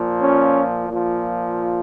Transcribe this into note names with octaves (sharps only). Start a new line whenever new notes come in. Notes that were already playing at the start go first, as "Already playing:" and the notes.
Already playing: A#2 F3
C#4
A#2 F3